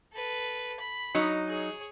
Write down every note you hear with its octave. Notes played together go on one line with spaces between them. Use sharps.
A4 B4
B5
F#3 D#4
G#4 C#5